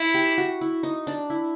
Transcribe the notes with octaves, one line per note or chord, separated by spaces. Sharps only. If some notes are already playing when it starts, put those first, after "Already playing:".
Already playing: E4
G4
F#4
E4
D#4
D4
E4